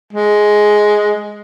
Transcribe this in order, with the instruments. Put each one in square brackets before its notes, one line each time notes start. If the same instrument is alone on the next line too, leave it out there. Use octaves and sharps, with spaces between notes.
[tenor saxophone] G#3